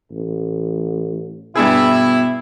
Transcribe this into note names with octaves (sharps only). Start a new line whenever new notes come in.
A1
G2 B2 E4 G#4